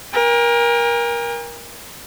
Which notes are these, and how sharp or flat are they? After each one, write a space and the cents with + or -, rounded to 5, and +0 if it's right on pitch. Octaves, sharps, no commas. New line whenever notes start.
A#4 +25 G#5 -45